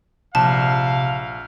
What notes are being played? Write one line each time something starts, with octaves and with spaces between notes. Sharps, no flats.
A#1 C3 F5 A5